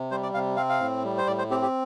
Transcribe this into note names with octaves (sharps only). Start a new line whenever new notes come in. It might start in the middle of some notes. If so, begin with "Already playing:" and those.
Already playing: C3
G3 C5
D5
C3 F5
C4 F5
F5
A2
G3
C5
A2 D5
C5
C4 G4
G4